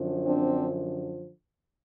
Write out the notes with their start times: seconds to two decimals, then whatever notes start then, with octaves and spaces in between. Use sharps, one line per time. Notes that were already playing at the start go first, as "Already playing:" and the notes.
Already playing: F#2 D3 F3
0.25 C4 D4